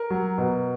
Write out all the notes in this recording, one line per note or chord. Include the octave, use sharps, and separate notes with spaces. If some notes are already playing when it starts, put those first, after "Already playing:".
Already playing: A#4
F#3
B2